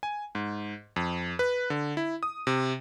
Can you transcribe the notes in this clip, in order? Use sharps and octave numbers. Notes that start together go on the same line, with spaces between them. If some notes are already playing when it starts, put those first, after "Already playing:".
G#5
G#2
F2
B4
D3
E4
D#6
C3